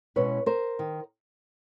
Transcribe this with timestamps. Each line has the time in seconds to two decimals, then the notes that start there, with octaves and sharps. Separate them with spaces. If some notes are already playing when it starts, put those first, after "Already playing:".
0.16 B2 G#3 C#4 E4 B4 C#5
0.46 A#4 C5
0.79 D#3